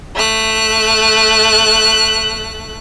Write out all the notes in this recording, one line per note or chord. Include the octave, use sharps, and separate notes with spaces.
A3 F#6